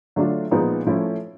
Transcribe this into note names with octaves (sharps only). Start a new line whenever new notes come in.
D3 F#3 A3 D4 F4
A#2 F3 G#3 B3 D#4
F3 A3 C#4 E4